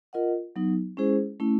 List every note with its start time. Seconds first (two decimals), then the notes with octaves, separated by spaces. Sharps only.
0.13 F4 A#4 D#5 F#5
0.56 F#3 B3 D#4
0.97 G#3 C#4 E4 G#4 C5
1.40 A3 C#4 E4